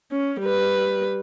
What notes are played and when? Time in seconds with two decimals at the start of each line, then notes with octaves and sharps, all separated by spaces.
0.12 C#4
0.41 G3 B4